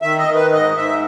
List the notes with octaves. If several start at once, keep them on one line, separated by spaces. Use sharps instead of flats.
D#3 E5
D#5
D#3
B4
G#2 D#5
G#2 E5